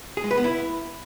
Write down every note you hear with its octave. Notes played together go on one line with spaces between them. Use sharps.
G#4
G#3
B4
B3
E4